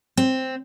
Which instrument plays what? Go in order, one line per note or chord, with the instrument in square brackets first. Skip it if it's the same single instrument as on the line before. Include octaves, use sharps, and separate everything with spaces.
[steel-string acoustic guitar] C4